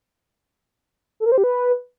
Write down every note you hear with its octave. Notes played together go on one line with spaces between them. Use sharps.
A4
A#4
C5
G4
B4